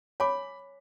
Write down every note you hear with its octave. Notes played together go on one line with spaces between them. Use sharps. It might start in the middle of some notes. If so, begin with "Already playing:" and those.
C#5 G#5 B5 D6